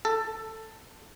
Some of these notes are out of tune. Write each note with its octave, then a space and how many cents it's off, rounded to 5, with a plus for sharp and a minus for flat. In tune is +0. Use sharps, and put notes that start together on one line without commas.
A4 +10